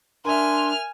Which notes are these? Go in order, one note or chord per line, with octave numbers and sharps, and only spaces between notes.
D4 A#4 E5 G#5 C6 F6